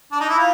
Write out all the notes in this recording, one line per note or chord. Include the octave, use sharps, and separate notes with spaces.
D4
D#4
E4
F4